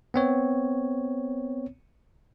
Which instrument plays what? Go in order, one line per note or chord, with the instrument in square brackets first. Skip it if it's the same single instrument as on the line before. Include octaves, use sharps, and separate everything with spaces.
[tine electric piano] B3 C4 C#5